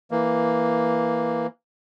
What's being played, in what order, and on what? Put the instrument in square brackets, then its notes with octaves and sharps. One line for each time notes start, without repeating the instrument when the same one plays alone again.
[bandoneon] E3 A#3